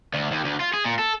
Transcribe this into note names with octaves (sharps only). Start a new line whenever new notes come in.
D2
D#2
D2
F4
G#4
A#2
A4